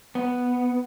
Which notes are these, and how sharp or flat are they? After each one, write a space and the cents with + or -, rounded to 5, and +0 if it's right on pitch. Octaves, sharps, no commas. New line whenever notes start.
B3 +0